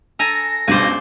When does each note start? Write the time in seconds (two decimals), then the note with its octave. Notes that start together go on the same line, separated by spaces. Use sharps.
0.19 A4 G#5 A#5 A#6
0.67 C#2 G2 B2 C5 D5 G#5